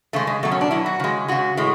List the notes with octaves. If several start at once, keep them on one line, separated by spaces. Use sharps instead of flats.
C#3 G#3 A3
G#3
B2 F#3 A3
C#4
D4
B2 F#3 E4
F#4
C#3 G#3
C#3 G#3 F#4
A2 G#3